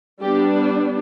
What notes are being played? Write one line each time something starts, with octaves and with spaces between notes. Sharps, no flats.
G3 B3 D4 G4